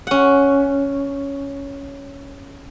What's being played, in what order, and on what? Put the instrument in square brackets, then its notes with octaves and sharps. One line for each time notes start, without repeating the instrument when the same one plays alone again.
[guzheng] C#4 F#5